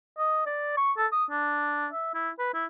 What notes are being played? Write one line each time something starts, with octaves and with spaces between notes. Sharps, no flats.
D#5
D5
C#6
A4
D#6
D4
E5
E4
B4
E4